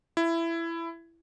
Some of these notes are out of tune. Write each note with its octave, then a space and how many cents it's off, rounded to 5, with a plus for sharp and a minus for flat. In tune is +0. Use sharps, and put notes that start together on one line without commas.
E4 +15